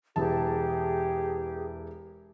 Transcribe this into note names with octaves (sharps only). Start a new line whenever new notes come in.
E1 E3 G4 G#4 A5